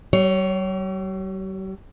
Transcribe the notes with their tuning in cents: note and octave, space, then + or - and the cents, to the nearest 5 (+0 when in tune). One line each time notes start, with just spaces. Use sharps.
G3 -45 C#5 +10